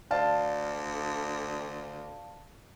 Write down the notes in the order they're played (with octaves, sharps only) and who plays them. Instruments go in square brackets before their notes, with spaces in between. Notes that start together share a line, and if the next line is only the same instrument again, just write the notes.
[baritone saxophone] D2 [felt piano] D5 F5 A5